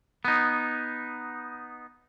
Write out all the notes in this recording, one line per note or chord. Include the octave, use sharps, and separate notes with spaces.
B3 D#4